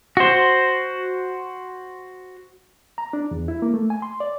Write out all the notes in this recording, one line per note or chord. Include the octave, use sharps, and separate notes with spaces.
F#4 C5
A#5
D4
E2
E4
A#3
A3
G#5
C6
D5